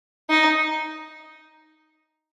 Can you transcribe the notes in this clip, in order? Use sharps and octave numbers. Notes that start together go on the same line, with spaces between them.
D#4